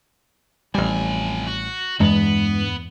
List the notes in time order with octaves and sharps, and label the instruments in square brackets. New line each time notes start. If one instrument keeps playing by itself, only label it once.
[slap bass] A1 G3 [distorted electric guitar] F2 G#5
[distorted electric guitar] F#4
[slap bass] E2 [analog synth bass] G2 [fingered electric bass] G#3 [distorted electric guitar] B3